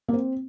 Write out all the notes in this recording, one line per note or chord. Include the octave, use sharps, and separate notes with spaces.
A#3
C4